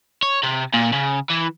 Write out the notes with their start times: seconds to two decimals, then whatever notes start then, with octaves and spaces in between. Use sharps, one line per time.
0.23 C#5
0.43 C3
0.74 A#2
0.93 C#3
1.30 E3